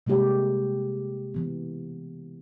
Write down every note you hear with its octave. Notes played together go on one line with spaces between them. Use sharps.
C3 G#3 A#3 G4 C#5
E3 B3